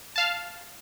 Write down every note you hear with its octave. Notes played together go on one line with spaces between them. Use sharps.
F5 A5